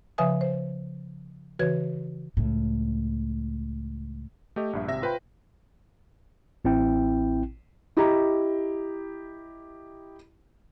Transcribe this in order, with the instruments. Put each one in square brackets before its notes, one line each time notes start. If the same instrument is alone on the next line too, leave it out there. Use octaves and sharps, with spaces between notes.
[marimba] C#3 F3 B4 E5 G#5 D#6
C5
C#3 E3 F#4 B4 C#5 G#6
[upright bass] C#2 A2
[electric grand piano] A3 G4 D#5
A#1 G2 E5
G#1 C3 E5 A#6
F4 B4 C5 G5 B5
[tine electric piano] A1 C4 E4 G5
[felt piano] E4 G4 D#5 A#5